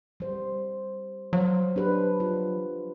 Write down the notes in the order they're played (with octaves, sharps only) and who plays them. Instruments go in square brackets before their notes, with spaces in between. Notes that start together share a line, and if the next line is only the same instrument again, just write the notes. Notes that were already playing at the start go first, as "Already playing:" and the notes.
[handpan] G3 C5
[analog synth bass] F#3 [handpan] C5 F5
[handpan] D4 G4 B4
F4